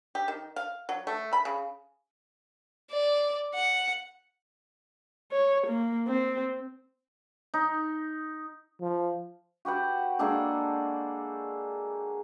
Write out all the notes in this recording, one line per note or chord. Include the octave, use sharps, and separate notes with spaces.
G4
D#3
F5
F#3
A3
B5
C#3
D5
F#5
C#5
A#3
C4
D#4
F3
F#4 G4 B4 F#5
G#3 A#3 D4 A4